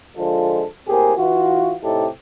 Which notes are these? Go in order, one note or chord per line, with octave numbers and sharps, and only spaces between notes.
D3 F3 G#3 F4 A4
A2 A#3 C4 G4 G#4
E3 F4 F#4
A2 C3 D#4 E4 G4 A4